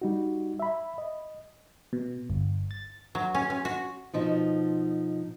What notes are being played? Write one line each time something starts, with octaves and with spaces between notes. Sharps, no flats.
G3 D#4 F#4
E5 B5
D#5
B2
G1
A6
F#3
C#4
C#4
F#4
B2 F3 D#4